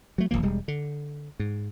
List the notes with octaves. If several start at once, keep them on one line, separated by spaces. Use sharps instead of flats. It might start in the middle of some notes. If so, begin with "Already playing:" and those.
F#3 A3
D#1 F#2 F3 A#3
E1 G3 G#3
D3
G#2